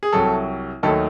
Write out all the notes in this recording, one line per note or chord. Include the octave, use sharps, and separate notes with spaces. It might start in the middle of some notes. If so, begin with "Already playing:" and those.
G#4
C2 C3 F#3 A4
D#2 D#3 F#3 A3 A4